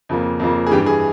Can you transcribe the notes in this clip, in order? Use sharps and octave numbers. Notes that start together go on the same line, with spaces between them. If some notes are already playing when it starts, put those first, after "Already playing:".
F2 C#3 F3 A#3
F2 C#3 F3 A#3
G#4
G2 E3 G3 G4
G#4